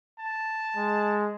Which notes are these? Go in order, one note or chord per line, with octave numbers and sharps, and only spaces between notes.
A5
G#3